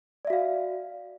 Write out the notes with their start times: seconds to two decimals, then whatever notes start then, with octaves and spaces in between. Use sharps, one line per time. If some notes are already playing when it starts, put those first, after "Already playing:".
0.25 D5
0.27 E5
0.30 F#4
0.33 F5